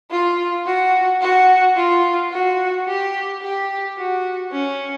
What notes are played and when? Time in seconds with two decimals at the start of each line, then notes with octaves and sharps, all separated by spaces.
0.11 F4
0.66 F#4
1.21 F#4
1.77 F4
2.32 F#4
2.88 G4
3.43 G4
3.98 F#4
4.53 C#4